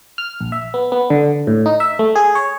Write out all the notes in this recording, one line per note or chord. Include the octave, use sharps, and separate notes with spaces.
F6
A#1
E5
B3
B3
D3
A2
D#4
E5
A3
G#4
C#5